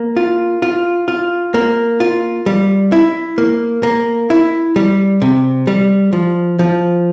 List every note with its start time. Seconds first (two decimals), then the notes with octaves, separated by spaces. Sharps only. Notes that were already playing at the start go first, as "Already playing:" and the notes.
Already playing: A#3
0.16 F4
0.62 F4
1.08 F4
1.54 A#3
2.00 F4
2.46 G3
2.92 E4
3.38 A#3
3.83 A#3
4.30 E4
4.76 G3
5.22 C3
5.67 G3
6.13 F3
6.59 F3